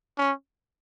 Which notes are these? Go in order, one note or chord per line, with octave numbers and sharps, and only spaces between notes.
C#4